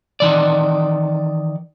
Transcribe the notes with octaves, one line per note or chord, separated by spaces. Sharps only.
D#3 E3 D5